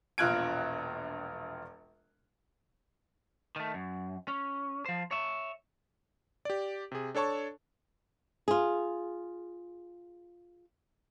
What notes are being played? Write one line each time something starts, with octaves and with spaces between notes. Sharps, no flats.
E1 A#1 F4 F#6 G#6 D7
D#3 A3
F#2
C#4
F3 C5
C#5 E5
G4 D5
C3 G#4
D4 A4 C#5 A5 C#6
F4 G#4